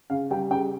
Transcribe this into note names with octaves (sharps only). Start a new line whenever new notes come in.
C#3 F5
G3 G5
C#3 G5